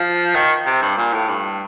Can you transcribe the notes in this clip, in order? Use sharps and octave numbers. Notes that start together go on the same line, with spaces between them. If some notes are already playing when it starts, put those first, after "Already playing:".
Already playing: F3
D#3
C3
G2
A#2
A2
G2